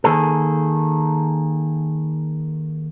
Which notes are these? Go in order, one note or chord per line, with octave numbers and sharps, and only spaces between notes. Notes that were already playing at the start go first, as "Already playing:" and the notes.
D#3 A#3 G#4 A4